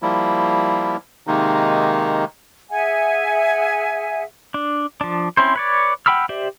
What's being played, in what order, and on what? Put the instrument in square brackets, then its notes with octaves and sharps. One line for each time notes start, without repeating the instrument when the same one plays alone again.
[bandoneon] F3 G3 A#3 E4
C3 D#3 G#3 A#3 D#4
[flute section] G#4 E5 F#5 G#5
[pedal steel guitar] D4
F3 D4
C4 C#4 E4 C5
B4 C#5 D5
F#5 G5 B5 E6 F6
G4 C5 D5 E5